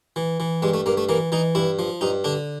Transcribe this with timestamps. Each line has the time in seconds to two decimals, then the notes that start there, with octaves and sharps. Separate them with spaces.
0.16 E3
0.40 E3
0.62 G2 G#3
0.74 A3
0.86 G2 A#3
0.97 A3
1.09 E3 A#3
1.32 E3 D#4
1.55 G2 E4
1.79 F3
2.01 G2 D#4
2.24 D3 D4